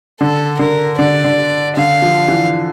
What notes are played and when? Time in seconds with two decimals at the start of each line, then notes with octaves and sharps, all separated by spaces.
0.21 D3 A4
0.59 D3 A#4
0.98 D3 D5
1.24 D3
1.76 D3 F5
2.02 F3
2.28 E3